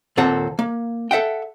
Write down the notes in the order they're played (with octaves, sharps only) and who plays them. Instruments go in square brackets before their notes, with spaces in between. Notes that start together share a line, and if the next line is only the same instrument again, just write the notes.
[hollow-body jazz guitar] D#2 A#2 C4 A4 F#5
A#3
A4 E5 F#5 G5